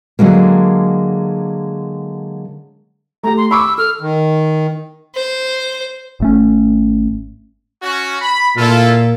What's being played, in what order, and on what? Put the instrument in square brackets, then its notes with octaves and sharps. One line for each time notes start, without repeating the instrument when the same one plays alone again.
[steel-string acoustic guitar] D3 F#3 G#3 A#3
[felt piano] A3 G4 [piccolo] A#5
[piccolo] C6
[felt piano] B5 C#6 D6 [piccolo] E6
[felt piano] A4 [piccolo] F6
[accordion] D#3
[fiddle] C5
[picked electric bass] G#1 A3 C#4
[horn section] C#4 F#4
B5
[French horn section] A#2 [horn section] E4 F4 A4